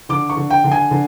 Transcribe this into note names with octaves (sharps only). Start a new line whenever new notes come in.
D3 D6
C#6
D3
G5
D3
G#5
D3